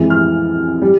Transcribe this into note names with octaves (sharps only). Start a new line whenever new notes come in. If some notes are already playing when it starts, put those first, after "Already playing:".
Already playing: F2 E3 G#3
F6
G3